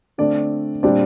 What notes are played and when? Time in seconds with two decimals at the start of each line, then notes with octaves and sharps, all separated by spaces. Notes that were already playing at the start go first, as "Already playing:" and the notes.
0.18 D3 A3 C4 D4 D5
0.83 A#2 G3 C4 D4 D5